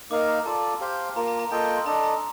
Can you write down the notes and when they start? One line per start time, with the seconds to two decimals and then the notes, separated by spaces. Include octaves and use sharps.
0.11 A#3 D#4 A#4 F5 D6
0.28 A#5
0.46 F4 A4 D5 A5
0.80 G4 C5 F5
1.16 A#3 F4 A#4 A#5
1.28 A#5
1.40 A#5
1.51 A#3 F4 A4 D#5 G5 A#5
1.77 C6
1.86 D4 A4 D#5 A#5
2.04 A#5